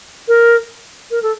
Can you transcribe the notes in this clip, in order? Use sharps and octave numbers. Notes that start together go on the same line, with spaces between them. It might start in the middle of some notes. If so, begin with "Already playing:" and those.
A#4
A#4
A4